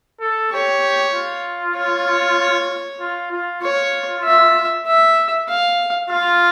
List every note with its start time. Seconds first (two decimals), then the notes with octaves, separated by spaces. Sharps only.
0.20 A4
0.52 G4 C#5
1.14 F4
1.76 C#5
3.00 F4
3.32 F4
3.62 F4 C#5
4.24 E5
4.87 E5
5.48 F5
6.10 F4 F5